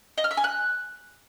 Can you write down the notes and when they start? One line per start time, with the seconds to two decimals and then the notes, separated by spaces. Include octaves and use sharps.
0.18 D#5
0.24 F6
0.31 E5
0.37 G#5
0.44 F#6